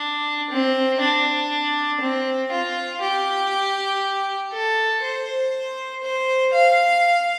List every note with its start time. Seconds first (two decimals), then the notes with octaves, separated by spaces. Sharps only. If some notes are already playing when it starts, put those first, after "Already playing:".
Already playing: D4
0.51 C4
1.00 D4
2.01 C4
2.52 F4
3.02 G4
4.53 A4
5.03 C5
6.03 C5
6.54 F5